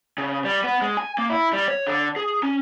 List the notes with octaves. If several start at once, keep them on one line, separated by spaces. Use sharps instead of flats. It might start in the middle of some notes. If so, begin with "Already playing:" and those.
C#3
G3
B3
G#3
G#5
A#3
E4
G3
C#5
D3
G#4
C#4